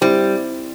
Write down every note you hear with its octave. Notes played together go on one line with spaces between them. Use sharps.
G3 C4 E4